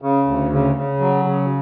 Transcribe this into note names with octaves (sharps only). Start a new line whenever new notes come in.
C#3
D2
C#3
C#3
F#3
C#3